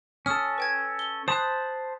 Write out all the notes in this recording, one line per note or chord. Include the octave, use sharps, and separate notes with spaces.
C#4 A4 D#6 F6
B4 G5 G#6
G7
C5 A5 B5 D#6 F#6